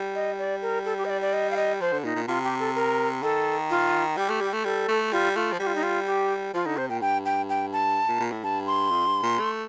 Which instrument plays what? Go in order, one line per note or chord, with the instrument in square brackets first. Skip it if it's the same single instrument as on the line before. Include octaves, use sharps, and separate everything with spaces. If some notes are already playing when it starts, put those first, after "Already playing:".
Already playing: [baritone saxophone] G3
[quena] D#5
D5
A#4
A4
G4
D#5
D5
D5
D#5
F5
D#5
[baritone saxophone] F3 [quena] C5
[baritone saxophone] D3
[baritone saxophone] A#2 [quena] D#4
[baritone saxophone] A#2
[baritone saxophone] C3 [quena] F4
[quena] G4
A4
A#4
[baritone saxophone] D#3 [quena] A4
[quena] F4
[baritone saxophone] G3 [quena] G4
[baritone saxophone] A3
G3
A3
[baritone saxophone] G3 [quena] A4
[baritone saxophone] A3
[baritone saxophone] G3 [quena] F4
[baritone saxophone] A3 [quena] F4
[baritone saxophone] F3
[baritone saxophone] G3 [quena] G4
[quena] F4
D#4
F4
G4
[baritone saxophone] F3 [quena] F4
[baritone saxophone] D3 [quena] D#4
[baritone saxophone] C3 [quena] C5
[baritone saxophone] A#2 [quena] G5
[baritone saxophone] G2 [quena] G5
[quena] G5
G5
A5
[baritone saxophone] A#2
A#2
A2
[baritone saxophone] G2 [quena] A5
[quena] C6
[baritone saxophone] F2
G2
A#2
A3